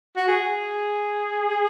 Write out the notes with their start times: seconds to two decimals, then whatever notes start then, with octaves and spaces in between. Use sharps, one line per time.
0.16 F#4
0.28 G#4